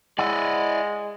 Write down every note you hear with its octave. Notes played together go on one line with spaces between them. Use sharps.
G#3 E4 D5 D#5 F#5